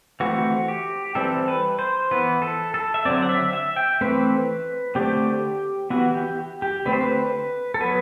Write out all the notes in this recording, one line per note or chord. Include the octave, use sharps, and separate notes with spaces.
E3 A3 C4 F#4
G4
E3 G3 C4 A4
B4
C5
E3 B3 B4
A4
A4
E5
D3 F#3 C4 D5
F#5
E5
E5
G5
E3 A3 C4 B4
D3 A3 C4 G4
E3 B3 F#4
G4
G4
D3 A3 C4 B4
C5
B4
A4
F#3 B3 B4